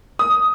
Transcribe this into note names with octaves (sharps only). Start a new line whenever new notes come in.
D#6